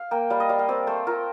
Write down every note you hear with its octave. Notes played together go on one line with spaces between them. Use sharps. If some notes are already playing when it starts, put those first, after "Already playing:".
Already playing: F5
A#3 G5
G3 F5
D#5
G3 F5
F5
C4 D5
A3 C5
F4 A#4